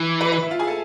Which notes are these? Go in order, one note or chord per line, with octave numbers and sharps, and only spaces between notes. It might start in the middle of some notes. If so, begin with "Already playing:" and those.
Already playing: E3
B4
B4
E4 E5
F4 F5
G#4 G#5
A4 A5